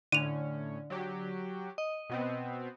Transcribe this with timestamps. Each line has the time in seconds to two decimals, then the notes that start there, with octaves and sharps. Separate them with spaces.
0.12 A2 D3 C#4 D#7 F7
0.90 F#3 G4
1.78 D#5
2.10 B2 B3 C4